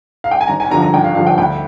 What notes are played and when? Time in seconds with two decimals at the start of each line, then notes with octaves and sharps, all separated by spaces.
0.24 F5
0.31 G5
0.41 G#5
0.48 G#1 A#5
0.60 G#5
0.70 G2 D3 F3 A#5
0.82 A#5
0.94 G#1 G5
1.04 F5
1.15 G2 D3 F3 F5
1.27 G5
1.38 D2 G5